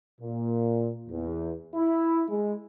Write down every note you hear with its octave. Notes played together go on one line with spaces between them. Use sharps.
A#2
E2
E4
G#3